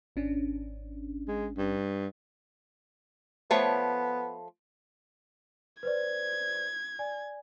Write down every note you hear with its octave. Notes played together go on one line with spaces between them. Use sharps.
G#1 C#4 D4
G#3
G2
F3 A3 B3 C#5
B4 C5 D5 G#6
D5 G#5